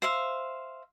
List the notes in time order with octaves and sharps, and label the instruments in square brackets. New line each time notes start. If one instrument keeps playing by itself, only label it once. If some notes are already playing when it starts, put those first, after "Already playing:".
[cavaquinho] C5 E5 F5